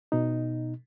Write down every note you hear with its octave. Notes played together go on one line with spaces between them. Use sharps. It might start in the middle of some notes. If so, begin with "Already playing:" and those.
B2 D#4